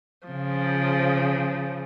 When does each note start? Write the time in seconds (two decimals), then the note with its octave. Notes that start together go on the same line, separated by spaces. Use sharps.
0.28 C#3 F3